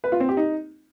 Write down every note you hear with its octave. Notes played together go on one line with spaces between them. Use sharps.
B4
F4
C4
G4
D#4